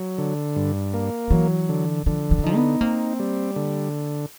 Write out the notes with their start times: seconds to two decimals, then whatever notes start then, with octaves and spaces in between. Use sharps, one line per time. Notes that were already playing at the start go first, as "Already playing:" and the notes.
Already playing: F#3
0.18 D3
0.56 G2
0.94 A#3
1.30 E3 F#3
1.69 D3
2.06 D3 F3
2.31 F3
2.39 F#3
2.44 F3 D#4
2.56 B3
2.81 A#3 C4
3.19 G3
3.56 D3